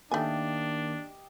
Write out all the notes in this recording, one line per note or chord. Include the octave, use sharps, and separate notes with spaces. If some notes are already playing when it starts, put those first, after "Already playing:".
D#3 A3 A#3 D4 G4 D#5 G#5